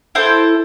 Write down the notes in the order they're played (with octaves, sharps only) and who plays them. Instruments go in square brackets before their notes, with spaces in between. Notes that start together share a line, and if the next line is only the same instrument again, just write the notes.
[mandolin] E4 A4 C5